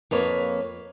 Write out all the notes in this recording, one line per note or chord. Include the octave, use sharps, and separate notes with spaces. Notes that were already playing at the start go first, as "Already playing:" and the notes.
F2 A#3 B4 C#5